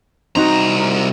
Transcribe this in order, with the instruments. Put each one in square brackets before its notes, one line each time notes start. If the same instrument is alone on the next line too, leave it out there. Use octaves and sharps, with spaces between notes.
[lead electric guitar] C2 A#5 [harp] C4 D#4 F#4